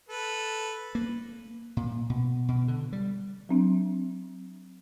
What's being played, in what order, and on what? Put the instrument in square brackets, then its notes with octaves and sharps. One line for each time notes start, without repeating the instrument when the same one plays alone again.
[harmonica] A4 B4
[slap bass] A#3
A#2
B2
B2
D3
G3
[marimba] F#3 C4 D4